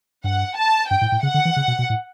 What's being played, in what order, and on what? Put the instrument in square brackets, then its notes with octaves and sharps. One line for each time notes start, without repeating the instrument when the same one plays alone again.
[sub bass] G2 [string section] F#5
[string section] A5
[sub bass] G2 [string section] G5
[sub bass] A2
A2
[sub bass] C#3 [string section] F#5
[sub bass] D3
E3
C#3
B2
B2
A2